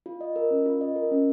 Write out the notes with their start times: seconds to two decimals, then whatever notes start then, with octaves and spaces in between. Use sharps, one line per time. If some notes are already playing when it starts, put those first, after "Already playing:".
0.06 F4
0.21 D#5
0.36 A#4
0.51 C#4
0.66 F4
0.81 D#5
0.96 A#4
1.11 C#4